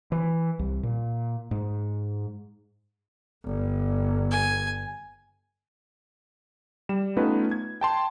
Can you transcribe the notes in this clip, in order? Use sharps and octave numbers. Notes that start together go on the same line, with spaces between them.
E3
C2
A#2
G#2
G1
G#5
G3 E7
A3 B3 C#4 D#4 F4 B4
G#6
G5 A5 C6